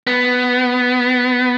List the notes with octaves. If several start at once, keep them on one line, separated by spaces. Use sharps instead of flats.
B3